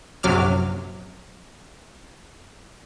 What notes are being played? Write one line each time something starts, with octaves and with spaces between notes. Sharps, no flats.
A#1 F#2 C3 F#3 D6 F6